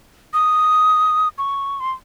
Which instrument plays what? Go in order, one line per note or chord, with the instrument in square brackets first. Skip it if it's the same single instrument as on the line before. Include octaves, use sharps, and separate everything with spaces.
[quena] D#6
C#6
C6